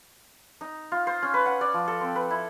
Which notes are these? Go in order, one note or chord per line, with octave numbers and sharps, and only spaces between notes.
D#4
F4
C5
C#4
B4
F#5
D5
F3
A4
C4
B4
E4